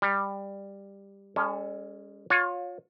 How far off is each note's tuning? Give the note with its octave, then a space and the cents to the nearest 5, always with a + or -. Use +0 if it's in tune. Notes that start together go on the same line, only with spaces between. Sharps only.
G3 +15 A#5 +0
G#3 -40 C#4 +15 A4 +0
F4 +30 C#5 +0